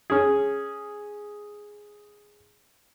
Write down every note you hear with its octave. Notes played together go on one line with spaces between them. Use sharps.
C#4 G#4